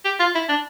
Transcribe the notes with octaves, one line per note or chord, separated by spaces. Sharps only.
G4
F4
E4
D4